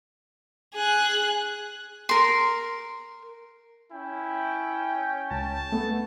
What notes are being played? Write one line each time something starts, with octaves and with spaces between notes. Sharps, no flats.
G#4 F#6
A#4 C6
C#4 E4 G5
C#2 A5
A3 B3 A4